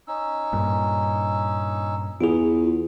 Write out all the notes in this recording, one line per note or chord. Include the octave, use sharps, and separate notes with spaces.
C#4 D#4 E6
G2 A#2
E2 F4 G#4